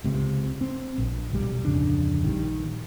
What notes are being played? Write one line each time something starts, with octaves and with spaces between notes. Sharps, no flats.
C#2 C3
C4
A#1
E1 B1 G3
D1 F2 C#3 D4
A#1 D#3 F3 G3